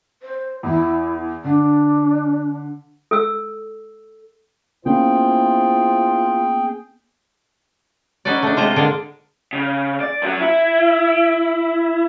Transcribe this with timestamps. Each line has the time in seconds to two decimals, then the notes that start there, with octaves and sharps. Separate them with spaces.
0.22 C5
0.63 E2 E4
1.44 D3 D4
3.11 A4 E6
4.86 A#3 B3 C#4 E4 F4 G#4 C5 G5
8.25 C#4 D#4 F#4 B4 D5
8.43 A3 D4
8.57 C3 G#3 F4 C5 D#5 A#5
8.76 D3 G#3 A#3 D5
9.53 C#3
10.00 D5
10.22 F#2 F#3
10.40 E4